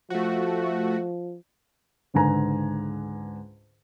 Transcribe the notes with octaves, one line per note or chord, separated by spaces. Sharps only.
F3 A3 F#4
C#2 G#2 D3 B4 G#5 A#5